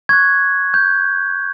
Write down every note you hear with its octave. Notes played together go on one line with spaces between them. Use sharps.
C#6 F#6 G#6
G6